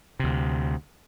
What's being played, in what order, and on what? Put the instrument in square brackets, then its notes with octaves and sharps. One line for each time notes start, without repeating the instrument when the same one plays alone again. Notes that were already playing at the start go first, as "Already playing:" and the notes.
[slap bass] D2 C3